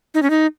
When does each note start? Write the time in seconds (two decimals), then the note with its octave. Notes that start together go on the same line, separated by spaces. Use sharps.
0.14 D#4
0.23 C#4
0.30 D#4